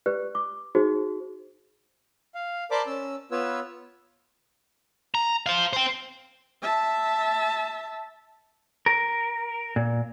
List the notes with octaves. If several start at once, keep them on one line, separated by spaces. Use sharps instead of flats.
G4 B4 D5 F#6
D6
D#4 F#4 G#4 C5
F5
A#4 C5 D5 A5 B5 D6
C#4 E6
B3 F4 B4 C#5 E6
A#5
C5 F5
C5 G5
E5 A5
A#4
A#2